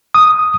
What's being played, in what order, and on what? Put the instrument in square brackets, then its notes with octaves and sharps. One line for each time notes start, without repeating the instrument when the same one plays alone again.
[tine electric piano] D#6